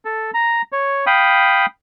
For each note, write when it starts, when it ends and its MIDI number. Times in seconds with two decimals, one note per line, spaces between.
0.05 0.31 69
0.34 0.62 82
0.72 1.05 73
1.06 1.66 77
1.06 1.66 79
1.06 1.66 83
1.06 1.66 87